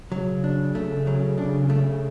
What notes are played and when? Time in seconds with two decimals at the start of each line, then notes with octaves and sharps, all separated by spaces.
0.12 C#3 F#3
0.44 D4
0.75 A3
1.07 F#3
1.38 D4
1.70 A3